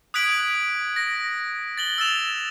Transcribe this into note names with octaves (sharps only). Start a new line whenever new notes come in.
D#6 F#6 G#6 B6 D7 F#7
A#6
A6 F#7 G7
E6 A6 E7 F7